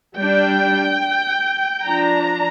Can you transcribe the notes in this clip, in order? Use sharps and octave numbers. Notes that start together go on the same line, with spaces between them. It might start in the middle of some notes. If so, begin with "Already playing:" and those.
G3 D4 G5
F3 D4 A#5